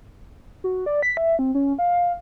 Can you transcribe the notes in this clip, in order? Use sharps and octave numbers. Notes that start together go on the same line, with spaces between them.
F#4
D5
B6
E5
C4
C#4
F5